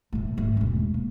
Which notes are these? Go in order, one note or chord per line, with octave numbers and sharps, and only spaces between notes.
A2 A3
G#2 A3
E1 C#4
A#3